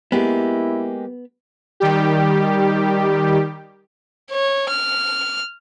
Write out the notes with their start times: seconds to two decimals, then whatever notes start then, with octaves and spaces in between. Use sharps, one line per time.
0.12 G#3 A#3 B3 E4 G4
1.80 D#3 G3 G4
4.31 C#5
4.70 F6